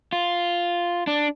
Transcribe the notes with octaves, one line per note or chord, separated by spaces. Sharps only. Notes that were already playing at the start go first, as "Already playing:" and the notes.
F4
D4